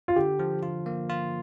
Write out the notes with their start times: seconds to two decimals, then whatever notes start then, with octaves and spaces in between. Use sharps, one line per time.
0.08 F4
0.16 D3 G4
0.39 F3
0.63 F4
0.86 A#3
1.10 F4